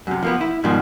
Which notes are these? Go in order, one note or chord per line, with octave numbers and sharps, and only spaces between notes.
F#2 C3
F3 A#3 B3
E4
G#2 B2 D#3 F3 G3